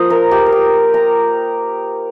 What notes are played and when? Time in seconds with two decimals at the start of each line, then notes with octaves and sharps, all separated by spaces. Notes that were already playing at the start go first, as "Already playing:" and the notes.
Already playing: F3 A#3 F4 C5 D#5
0.10 A#4
0.31 G4
0.46 A#4
0.52 G4
0.94 A#5